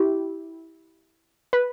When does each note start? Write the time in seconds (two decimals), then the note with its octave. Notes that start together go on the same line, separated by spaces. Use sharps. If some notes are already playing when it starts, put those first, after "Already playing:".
Already playing: E4 G4
1.53 B4